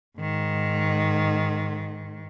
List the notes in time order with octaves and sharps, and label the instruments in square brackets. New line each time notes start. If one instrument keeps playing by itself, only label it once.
[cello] G#2 D#3